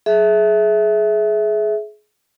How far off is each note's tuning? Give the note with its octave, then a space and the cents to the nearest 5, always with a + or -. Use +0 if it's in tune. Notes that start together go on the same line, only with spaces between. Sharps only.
G#4 +25 E5 -10